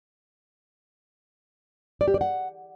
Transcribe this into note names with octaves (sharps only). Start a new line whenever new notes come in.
D5
G4
D5
F#5